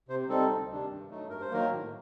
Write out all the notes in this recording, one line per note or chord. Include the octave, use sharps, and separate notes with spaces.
C3 C5
G3 C4 D#4 A4
D2
C3 D#3 G3 D4
G2
F#3 A3 D#4
G2 A#4
C5
D#3 F#3 A#3 A#4
A2